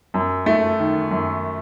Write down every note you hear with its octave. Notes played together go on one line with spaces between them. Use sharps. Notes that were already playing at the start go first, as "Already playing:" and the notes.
F#2
A3
D#3
F#2